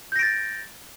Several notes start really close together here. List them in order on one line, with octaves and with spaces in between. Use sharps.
G6 A#6 D7 A6